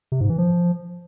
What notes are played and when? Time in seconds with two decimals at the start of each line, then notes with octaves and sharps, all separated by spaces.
0.12 C3
0.21 G#2
0.29 E3
0.38 F3